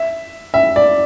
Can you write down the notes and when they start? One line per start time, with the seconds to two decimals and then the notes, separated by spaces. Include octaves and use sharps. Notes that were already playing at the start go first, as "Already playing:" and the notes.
Already playing: E5
0.54 E5
0.76 D5